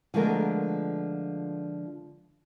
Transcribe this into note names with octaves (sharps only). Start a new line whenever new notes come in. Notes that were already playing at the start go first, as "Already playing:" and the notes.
D3 F3 G#3 A3 B3 A#4